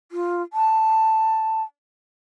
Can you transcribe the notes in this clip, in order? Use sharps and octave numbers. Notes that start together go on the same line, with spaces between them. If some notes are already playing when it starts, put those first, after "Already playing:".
F4
A5